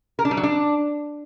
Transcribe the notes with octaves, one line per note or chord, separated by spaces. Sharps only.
A#4
D4
G3
F#3
D4